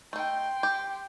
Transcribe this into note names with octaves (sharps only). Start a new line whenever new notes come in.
A3 D#4 G5 C6
G4